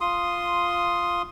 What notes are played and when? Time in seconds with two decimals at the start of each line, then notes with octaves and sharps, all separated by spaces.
0.01 F4 C6 D#6